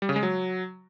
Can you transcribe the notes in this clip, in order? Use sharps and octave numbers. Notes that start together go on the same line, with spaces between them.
G3
C#3
G#3
F#3